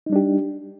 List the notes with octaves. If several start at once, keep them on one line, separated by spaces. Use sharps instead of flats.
G3 D4 D#4 G4